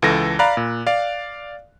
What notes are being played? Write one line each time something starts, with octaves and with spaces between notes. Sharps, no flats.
C#2 E3 A4 A#6
D5 F5 A#5 B5 F#6
A#2
D5 F5